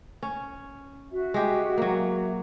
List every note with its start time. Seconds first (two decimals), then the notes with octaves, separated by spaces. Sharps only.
0.23 C#4
1.12 F#4 E5
1.34 G#3 G4
1.78 F#3 A#3